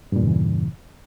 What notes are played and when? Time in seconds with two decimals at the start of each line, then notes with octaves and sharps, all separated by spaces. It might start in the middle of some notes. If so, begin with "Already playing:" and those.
0.12 G2
0.16 A#2
0.20 E2
0.24 C#3
0.27 E3